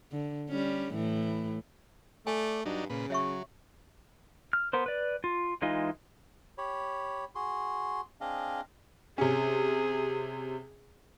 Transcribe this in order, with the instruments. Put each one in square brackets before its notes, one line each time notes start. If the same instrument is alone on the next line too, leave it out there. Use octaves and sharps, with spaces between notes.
[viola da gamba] D3
G3 C#4
A2 E3
[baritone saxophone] A3 [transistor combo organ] D5 [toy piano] G#5
[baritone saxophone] G2 [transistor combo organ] F#3 D4 D#4
[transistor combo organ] A#2 B4 [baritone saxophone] C#3
[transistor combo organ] F#3 [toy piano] C#5 E5 C#6
[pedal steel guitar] F6
B3 A#4 C5
B4 D5
F4
E3 G#3 D#4 F4 D#5
[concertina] G4 C#5 B5
F#4 G#4 C6
C4 D4 G#4 D#5 F5
[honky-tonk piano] C3 C#4 [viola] G#4